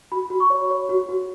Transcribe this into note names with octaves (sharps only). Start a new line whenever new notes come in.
F#4 B5
F#4
C#6
C#5
C#5
F#4
F#4